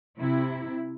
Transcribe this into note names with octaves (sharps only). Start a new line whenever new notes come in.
C3 E4